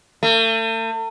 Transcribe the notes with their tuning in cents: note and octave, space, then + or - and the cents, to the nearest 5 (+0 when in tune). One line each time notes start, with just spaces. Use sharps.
A3 +40